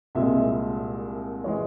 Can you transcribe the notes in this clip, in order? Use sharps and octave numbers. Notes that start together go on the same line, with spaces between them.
C2 A#2 G#3 E5
E3 G#3 C#5